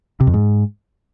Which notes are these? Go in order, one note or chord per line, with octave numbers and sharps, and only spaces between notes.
C3
F2
G#2